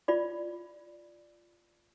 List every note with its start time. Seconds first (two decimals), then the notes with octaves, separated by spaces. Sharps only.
0.08 F4 D5 B5